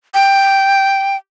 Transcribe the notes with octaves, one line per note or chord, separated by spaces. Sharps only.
G5